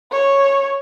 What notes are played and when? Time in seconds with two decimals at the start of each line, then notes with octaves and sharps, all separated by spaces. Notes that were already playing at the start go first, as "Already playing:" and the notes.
0.12 C#5